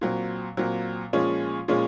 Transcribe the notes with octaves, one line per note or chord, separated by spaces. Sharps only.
A#2 F#3 C4
A#2 F#3 C4
A#2 F3 G#3 C#4
A#2 F3 G#3 C#4